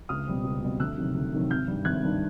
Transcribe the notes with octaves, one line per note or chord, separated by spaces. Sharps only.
C#2 D#6 F6
B2 G3 C4
C#2
B2 G3 C4
D2 E6 F#6
C3 D#3 F#3
D2
C3 D#3 F#3
G#1 F6 G6
G2 D#3 G3
G#1 F#6 G#6
G2 D#3 G3